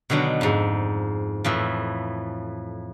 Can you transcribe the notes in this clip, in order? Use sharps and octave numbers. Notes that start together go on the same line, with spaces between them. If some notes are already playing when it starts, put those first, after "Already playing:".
B2 D3 D#3 F#3 D4
F2 G#2
F2 A2 E3